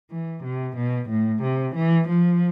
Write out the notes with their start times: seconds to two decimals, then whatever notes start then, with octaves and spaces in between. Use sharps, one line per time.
0.11 E3
0.44 C3
0.76 B2
1.09 A2
1.43 C3
1.75 E3
2.08 F3